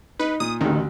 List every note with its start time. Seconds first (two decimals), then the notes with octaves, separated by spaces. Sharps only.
0.20 D#4 B4
0.40 A#2 D#6
0.61 A1 D2 D#3